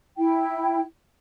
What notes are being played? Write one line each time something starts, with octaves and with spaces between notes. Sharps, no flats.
E4 G5